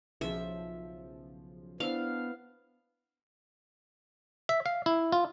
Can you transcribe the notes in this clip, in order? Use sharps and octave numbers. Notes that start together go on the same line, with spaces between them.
B1 C#3 F3 G#4 E5
B3 D4 E4 C5 F5 F6
E5
F5
E4
F4